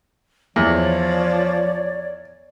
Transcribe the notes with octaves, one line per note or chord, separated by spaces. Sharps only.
E2 F3 C#5 D5